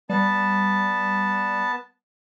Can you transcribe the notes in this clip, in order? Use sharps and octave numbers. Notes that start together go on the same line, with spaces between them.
G3 B3 A5